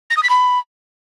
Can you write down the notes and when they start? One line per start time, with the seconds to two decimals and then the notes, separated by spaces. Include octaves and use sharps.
0.10 A#6
0.17 D#6
0.23 B6
0.30 B5